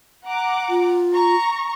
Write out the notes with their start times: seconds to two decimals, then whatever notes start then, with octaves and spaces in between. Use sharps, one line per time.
0.25 F#5 A#5 D6
0.69 F4
1.13 A#5 C#6